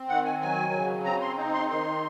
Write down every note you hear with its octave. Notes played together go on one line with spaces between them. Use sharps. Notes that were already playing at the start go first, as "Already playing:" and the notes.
Already playing: C4
D#3 F#5
G#5
F#3 G#5
C#3
C4 A#5
C6
D#4
C6
D#3 C6